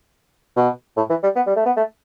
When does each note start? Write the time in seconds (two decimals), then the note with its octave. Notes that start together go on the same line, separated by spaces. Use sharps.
0.56 B2
0.97 A2
1.09 E3
1.23 G3
1.36 B3
1.47 G3
1.56 A3
1.66 B3
1.77 A3